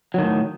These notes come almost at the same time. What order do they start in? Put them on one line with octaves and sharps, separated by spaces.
F#3 D#3 A2